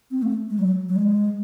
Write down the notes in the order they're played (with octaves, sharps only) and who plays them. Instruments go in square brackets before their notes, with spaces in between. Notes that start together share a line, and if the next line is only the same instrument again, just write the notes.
[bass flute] C4
A3
G#3
F#3
F#3
G#3